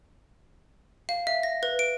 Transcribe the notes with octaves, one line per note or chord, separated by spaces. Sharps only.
F5
E5
A#6
B4
D7